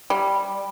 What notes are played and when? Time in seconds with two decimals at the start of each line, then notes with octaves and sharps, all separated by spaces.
0.10 G3